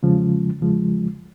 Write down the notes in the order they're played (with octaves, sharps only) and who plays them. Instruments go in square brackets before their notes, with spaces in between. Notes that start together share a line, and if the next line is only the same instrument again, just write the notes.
[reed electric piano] E2 C#3 F3 G#3
E2 C#3 F3 G#3